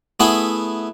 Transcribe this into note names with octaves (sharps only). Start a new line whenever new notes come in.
A3 B3 E4 G#4 F#5 G#5